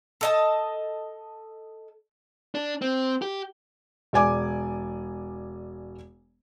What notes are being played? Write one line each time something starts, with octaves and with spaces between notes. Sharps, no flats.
A4 D#5 A5
D4
C4
G4
E1 D5 G#5 D6